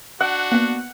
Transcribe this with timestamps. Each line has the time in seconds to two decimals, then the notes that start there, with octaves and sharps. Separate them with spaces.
0.21 D4 F#4 F#5
0.52 A#3 B3